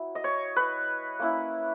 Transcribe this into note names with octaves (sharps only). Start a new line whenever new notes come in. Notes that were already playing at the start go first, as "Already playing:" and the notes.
Already playing: F#3 E4
D#5
C#5
B4
A#3 C#4 E4